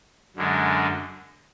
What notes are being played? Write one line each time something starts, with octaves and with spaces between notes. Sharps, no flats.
F#2 D3 G#3